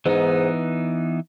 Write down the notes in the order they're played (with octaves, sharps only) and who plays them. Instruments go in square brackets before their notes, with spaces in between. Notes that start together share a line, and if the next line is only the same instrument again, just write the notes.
[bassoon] G#2 [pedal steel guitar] E3 B3 D#4